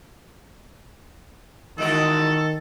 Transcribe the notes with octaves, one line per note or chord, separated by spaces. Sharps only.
E2 D#3 G#3 F#4 A4